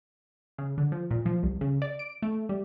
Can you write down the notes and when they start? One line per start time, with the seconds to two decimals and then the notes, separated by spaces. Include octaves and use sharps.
0.58 C#3
0.78 D3
0.92 F3
1.11 A#2
1.26 F3
1.43 C2
1.61 C#3
1.82 D5
1.99 D7
2.22 A3
2.49 G3